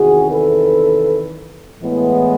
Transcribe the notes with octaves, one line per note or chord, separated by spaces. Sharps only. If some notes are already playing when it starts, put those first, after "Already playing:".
Already playing: E2 C3 D#3 F#4 G#4
A4 B4
A2 E3 G#3 B3